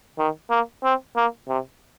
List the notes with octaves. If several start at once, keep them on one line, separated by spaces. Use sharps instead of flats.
D#3
A#3
C4
A#3
C3